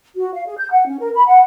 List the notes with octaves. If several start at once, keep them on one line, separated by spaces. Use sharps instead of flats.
F#4
F5
G#4
G6
F#5
C#4
A#4
B5
F#5